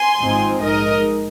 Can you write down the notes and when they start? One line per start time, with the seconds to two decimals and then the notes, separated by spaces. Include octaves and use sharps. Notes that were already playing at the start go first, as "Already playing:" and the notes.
Already playing: G#5 C6
0.20 G#1 G#2 F3 C4 D#4
0.63 A#1 G#2 G#3 D#4 A#4 D#5